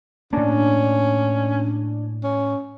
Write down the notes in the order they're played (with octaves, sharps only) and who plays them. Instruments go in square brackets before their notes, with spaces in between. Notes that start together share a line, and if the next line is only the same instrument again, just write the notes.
[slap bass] A2 A#3 [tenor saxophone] C#4 [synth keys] D4
[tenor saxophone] C#4